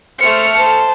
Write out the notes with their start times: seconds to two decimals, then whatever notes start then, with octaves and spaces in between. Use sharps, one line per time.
0.20 A3 C5 F6 C#7
0.55 C5 A5